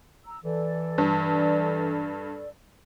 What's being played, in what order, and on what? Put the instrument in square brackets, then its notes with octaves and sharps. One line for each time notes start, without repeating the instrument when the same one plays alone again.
[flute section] A#5 E6
[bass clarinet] E3 [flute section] A4 D5
[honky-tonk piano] G2